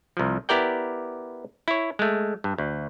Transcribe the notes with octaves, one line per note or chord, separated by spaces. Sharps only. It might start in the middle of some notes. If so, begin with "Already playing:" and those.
C2 F3
B3 E4 G4 A#4 D5 G5
E4 C#5
G#3 A3
G2
D2